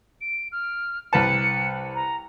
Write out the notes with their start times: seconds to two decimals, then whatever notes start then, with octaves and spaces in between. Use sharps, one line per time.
0.21 D7
0.52 F6
1.13 C2 B4 A5 C#7
1.95 A#5